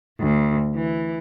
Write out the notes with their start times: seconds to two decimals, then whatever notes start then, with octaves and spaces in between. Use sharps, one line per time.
0.19 D2
0.75 E3